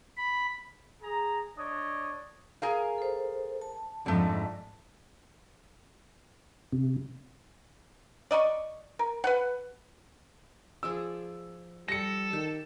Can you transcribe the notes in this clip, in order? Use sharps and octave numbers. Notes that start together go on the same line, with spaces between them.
B5
G#4 A#5
D4 C#5 D#5
G#4 A#4 F5
A4 C5
A5
F2 G#2 D3 A3
C3
D5 D#5 B5 C#6
A#4
B4 F#5
F3 G#4 D5 E6
G3 A4 A#6 C#7
D#3 G4